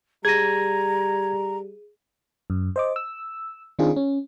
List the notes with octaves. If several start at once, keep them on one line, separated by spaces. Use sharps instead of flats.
G3 G#4 A#5 G#6 A#6 D#7
F#2
C5 D#5 D6
E6
D#3 C4 D4 D#4 F4 G#4
C#4